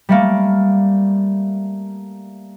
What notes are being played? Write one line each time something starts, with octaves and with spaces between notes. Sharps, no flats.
G3 A3 A#3